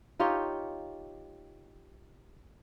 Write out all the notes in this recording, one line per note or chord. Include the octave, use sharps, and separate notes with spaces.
D#4 F4 G4 C#5